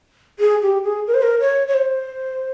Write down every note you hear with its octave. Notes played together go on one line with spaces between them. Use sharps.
G#4
G4
G#4
A#4
C5
A#4
C#5
C#5
C5